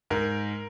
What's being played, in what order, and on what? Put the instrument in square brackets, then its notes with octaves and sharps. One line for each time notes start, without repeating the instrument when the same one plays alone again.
[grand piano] G#2 A#4